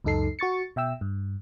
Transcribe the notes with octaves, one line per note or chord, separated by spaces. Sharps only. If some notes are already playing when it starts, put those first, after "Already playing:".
C#2 F#2 D#4 A4 C7
F#4 C#6 A6 C#7
B2 E5 G5 E6
G2